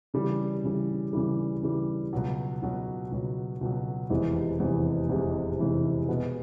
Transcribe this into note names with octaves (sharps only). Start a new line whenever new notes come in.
C#3 E3 G3
C#3 E3 G3
C#3 E3 G3
C#3 E3 G3
C#2 B2 F#3
C#2 B2 F#3
C#2 B2 F#3
C#2 B2 F#3
F1 E2 C3 E3 G#3
F1 E2 C3 E3 G#3
F1 E2 C3 E3 G#3
F1 E2 C3 E3 G#3
B2 G#3 B3